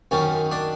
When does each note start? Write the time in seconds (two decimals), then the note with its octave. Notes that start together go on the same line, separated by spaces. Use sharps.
0.11 F#2 D#3 C#4
0.52 D4